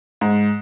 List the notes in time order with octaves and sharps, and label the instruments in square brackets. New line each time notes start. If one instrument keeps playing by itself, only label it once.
[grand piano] G#2